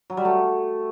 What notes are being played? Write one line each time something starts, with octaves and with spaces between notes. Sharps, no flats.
F#3
G3
A3